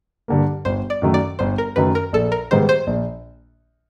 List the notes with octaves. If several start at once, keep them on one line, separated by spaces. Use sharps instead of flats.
G2 D3 G3 A#3
G1 C5
D5
F#2 D#3 F#3 A3
D5
G1 C5
A#4
F#2 D#3 F#3 A3 B4
A#4
A#1 A4
A#4
G#2 D#3 G3 B3 C5
C5
A#1